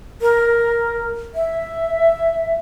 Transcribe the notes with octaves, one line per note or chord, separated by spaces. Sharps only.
A#4
E5